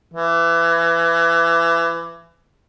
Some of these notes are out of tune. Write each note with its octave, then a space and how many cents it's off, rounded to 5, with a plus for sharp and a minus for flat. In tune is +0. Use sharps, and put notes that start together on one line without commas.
E3 +25